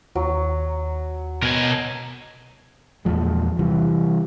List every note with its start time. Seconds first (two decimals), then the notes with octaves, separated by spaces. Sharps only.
0.15 D#2 F#3
1.43 B2 A#4 G#5
3.05 E2 A#2 F3 G#3
3.59 C3 E3 G3